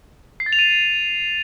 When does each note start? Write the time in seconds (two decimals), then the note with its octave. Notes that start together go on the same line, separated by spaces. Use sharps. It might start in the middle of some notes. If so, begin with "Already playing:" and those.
0.40 C7
0.46 A6
0.53 F7
0.59 D#7